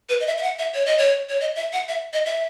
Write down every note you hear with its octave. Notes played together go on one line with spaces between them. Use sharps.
B4
D#5
E5
E5
F#5
E5
C#5
D#5
C#5
C#5
D#5
E5
F#5
E5
D#5
E5